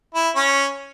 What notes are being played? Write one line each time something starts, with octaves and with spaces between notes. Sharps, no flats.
E4
C#4